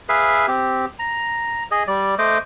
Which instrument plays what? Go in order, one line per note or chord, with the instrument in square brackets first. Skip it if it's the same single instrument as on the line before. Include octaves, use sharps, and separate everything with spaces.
[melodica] G#4 B4 E5 F5
C4 G4
A#5
G#4 D#5
G3 D5
A3 C5 D#5 D6